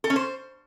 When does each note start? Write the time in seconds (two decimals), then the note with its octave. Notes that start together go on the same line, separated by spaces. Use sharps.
0.04 A4
0.10 C#4
0.16 C5